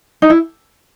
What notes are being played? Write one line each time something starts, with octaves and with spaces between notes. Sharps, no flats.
D#4
E4